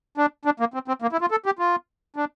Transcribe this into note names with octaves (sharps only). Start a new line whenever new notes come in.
D4
D4
A#3
C4
C4
A#3
E4
F4
A4
G4
F4
D4